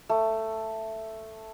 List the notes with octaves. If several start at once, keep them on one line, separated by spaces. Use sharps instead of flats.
A3